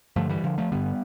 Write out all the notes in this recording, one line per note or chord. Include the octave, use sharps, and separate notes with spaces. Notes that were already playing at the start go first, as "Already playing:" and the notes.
G2 D3 F3 A3
E3 G3
D3 F3
F3 A3
G2 D3 G3 B3